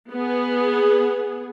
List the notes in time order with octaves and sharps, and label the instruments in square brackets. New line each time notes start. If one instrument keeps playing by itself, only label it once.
[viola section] B3 G#4